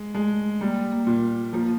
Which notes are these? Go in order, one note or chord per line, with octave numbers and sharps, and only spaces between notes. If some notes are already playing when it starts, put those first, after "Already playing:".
Already playing: G#3
G#3 A3
G3 A#3
A#3
A#2
F3 A#3